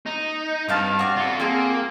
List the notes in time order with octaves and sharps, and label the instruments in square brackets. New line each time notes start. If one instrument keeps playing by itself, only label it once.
[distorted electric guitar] D#4
[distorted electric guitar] G2 [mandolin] C4 F5 A5
[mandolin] F#4 D5 F5
[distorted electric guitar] F4 A4
[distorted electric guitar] A#3 [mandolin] C4 F4 G#4